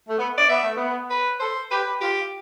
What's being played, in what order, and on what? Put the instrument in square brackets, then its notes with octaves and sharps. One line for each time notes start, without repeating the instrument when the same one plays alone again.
[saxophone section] A3
B3
[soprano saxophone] D5
[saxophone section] B3 [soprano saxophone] E5
[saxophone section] A3
B3
[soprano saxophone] B4
[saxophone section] A4 [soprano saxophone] C5
[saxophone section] G4 [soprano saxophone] B4
[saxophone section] F4 [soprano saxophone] G4